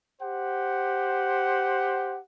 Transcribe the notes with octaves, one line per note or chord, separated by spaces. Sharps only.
G4 C5 F#5